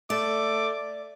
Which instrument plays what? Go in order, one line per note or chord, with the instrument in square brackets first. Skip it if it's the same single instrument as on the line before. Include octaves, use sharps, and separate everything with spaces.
[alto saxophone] A3 [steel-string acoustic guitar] D5 [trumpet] D6